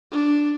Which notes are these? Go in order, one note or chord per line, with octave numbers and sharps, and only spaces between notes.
D4